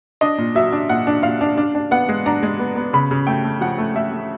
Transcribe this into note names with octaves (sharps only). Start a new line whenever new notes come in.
D4 D#5
A#2
F#3 E5
D4
A#2 F#5
D4
A#2 F5
D4
D4
D4
B3 F#5
G#3
D4 A#5
G#3
B3
B3
C#3 B5
C#3
A3 G5
A3
F3 F#5
A3
A3 E5
A3